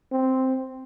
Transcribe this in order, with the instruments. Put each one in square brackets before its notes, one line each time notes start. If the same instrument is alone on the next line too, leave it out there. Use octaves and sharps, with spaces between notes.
[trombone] C4